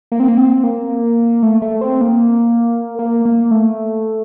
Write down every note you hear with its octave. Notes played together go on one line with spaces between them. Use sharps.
A#3
C4
A#3
C4
A#3
A3
A3
C4
A#3
A#3
A#3
A3